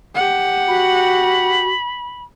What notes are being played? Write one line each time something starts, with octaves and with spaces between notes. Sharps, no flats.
G4 F#5
F#4 B5